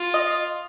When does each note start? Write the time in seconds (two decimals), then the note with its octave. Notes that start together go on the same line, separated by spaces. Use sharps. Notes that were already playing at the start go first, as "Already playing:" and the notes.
Already playing: F4
0.14 D#5 D#6